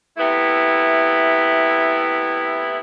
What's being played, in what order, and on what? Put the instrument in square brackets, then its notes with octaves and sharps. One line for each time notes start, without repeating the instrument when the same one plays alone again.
[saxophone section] C3 A3 B3 E4